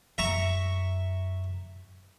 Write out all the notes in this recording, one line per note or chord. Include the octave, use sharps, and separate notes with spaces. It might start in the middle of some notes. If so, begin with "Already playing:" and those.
F#2 E5 A#5 C#6